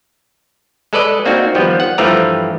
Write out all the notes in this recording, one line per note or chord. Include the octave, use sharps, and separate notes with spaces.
G#3 A4 B4 D5 D#5
A#3 C4 D4 D#4 F#4
D#3 F3 G3 B3
F#5
G2 E3 F3 A3 G4 A#5